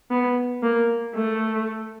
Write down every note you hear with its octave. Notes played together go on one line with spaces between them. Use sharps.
B3
A#3
A3